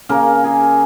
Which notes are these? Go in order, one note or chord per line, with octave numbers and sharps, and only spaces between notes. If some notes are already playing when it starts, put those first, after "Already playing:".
C#3 A#3 A#4
G#4